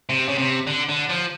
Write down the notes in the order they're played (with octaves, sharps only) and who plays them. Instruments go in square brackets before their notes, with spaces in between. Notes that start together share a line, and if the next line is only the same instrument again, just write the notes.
[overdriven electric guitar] C3
C#3
C3
D3
D3
F3